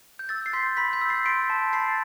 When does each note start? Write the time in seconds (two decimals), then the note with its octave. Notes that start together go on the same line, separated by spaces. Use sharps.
0.19 G6
0.29 E6 A6
0.46 C7
0.53 C6 G6 B6
0.77 B5 G6 B6
0.93 G6 B6
1.01 E6
1.09 A6 C7
1.26 C6 B6 D7
1.50 A5
1.73 B5 A6 C7